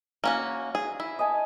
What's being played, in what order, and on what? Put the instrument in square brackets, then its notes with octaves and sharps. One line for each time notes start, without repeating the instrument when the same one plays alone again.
[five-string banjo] A#3 C#4 F#4
G#4
E4
[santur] D#5 G#5 A5